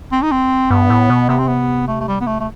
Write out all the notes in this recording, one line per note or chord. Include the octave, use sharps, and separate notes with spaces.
C4
D#4
C4
G2 B3
A2
B2
C3 B3
C4
B3
A3
A3
G3
B3
A3
A3